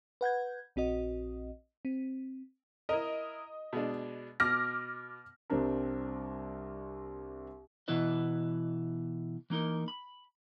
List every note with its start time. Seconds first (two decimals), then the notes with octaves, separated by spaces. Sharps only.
0.21 B4 F#5 G6 G#6
0.76 A#1 C4 F#4 D#5
1.85 C4
2.89 E4 A#4 D#5
3.73 B2 G#3 D4
4.40 B2 D6 F6 A#6
5.50 C2 G3 C4 D4 A#4
7.88 B2 E3 B3 E4 B4 D#5
9.50 E3 A#3 D#4 A#4
9.88 B5